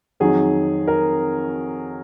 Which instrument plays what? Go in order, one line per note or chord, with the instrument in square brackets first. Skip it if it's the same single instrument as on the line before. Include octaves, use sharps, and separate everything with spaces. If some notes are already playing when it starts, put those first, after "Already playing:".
[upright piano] F2 D#3 F#3 G#4
A#4